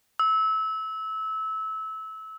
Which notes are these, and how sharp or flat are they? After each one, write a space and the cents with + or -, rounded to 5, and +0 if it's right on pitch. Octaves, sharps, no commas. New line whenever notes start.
E6 -25